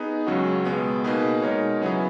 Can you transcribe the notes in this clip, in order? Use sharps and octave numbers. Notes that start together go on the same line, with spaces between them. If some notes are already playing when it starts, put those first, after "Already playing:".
Already playing: B3 D#4 G#4 B4
C#2 C#3 F#3 C#4 F#4
C#2 B2 G#3 B3
B2 A#3 D#4 G#4 B4
B2 G#3 D#4 A#4 C#5
C#3 F#3 B3 E4 G#4